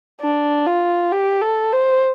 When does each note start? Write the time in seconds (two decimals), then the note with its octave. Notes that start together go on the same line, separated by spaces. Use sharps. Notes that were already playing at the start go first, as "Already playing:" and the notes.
0.21 D4
0.66 F4
1.11 G4
1.42 A4
1.72 C5